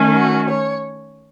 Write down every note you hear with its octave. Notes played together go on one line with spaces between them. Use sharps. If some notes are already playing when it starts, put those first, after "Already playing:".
Already playing: D#3 A3 C#4
F#4
C#5